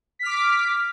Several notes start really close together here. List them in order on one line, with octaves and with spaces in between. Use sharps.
B6 F6 D6